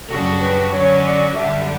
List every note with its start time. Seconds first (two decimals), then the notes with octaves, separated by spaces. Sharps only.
0.09 F#2 C#3 G3 D4 F#4 A4
0.41 B4
0.73 D3 F#3 C#4 F#4 C#5
1.05 D5
1.35 F#2 D3 G3 D4 E5